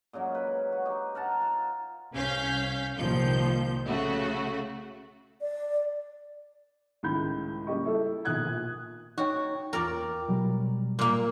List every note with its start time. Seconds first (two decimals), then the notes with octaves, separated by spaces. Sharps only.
0.13 A#2 C#3 F#3 G#3
0.35 B4
0.72 F#4
0.85 D#4 G4
1.15 A#4 F#5 A5 A#5
1.41 F4
2.15 C2 C#4 F5 G6 B6
2.97 C2 A#2 D#3 F3 G6
3.87 C#3 A3 F#4
5.41 D5
7.03 C#2 A2 D#3 B5 G6
7.67 C#3 G3 A#3 G4 D#5 C#6
7.85 E4 A4
8.25 A#1 B2 D#3 D#6 F#6 G#6
8.47 A#2
9.18 D#4 F#4 C#5 G5
9.73 E2 F4 A#4 D5 G5
10.28 B2 F#3 G3
10.99 A#2 A#3